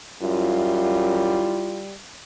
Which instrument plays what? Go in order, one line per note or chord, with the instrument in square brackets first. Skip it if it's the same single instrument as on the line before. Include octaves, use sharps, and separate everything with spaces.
[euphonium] F#2 [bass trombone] G3 [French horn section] E4 F4